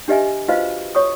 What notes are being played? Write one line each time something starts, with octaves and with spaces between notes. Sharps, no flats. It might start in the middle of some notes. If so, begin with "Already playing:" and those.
D4 G4 B4 D#5 E5 G#5
F4 F#4 B4 C5 D#5 F5
C#5 C#6 D#6